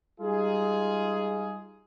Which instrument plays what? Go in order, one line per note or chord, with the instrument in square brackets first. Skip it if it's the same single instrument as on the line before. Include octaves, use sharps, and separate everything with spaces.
[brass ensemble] G3 G#3 D#4 F4 G#4